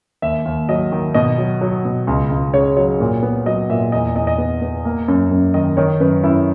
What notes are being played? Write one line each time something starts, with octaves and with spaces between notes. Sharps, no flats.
D#2 E5
D#2
F#3 D#5
D#3
B2 D#5
F#3
F#3
B2
C#2
C#2
C#3 C#5
F#3 C#5
A#2
B3
F#3 D#5
A#2 E5
E2 D#5
E2 D#5
D#5
B3
B3
A#3
F#2
F#2
D#3 D#5
D#3 C#5
F#2 B4
F#2 E4